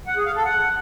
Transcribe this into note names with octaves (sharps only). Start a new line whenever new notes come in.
F#5
G#4
F5
A4
F#5